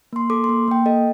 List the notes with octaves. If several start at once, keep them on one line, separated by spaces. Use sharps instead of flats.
A#3 C6
A4 D6
C6
A#3
A#3 G5
A4 D#5